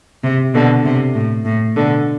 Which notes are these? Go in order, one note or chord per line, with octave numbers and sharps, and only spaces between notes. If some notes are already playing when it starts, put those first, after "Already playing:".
C3
B2 D3
C3
A2
A2
B2 D3